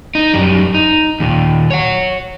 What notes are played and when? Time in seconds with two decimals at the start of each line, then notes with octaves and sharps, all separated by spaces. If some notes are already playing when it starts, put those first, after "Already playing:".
0.15 D#4
0.34 F#2 G3
0.74 D#4
1.20 D#2 A#2
1.70 C#5 F#5